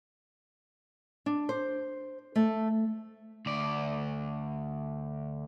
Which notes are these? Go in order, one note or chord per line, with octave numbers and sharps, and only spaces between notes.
D4
C5
A3
D2 D5